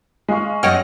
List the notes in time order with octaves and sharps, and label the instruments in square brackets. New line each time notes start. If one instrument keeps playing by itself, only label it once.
[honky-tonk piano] G#3 F5 C#6
[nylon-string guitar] F#2 D#5 F#5 [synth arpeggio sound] C#5 G5 F6